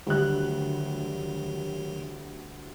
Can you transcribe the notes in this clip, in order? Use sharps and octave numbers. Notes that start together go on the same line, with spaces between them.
D2 D#3 F#3 G3 F#6